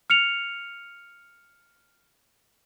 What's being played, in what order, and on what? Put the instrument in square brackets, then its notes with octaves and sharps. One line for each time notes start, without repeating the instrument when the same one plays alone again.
[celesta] F6 C#7 F7